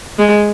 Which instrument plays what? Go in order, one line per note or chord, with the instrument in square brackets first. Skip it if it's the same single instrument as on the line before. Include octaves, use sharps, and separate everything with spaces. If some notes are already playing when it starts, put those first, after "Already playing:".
[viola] G#3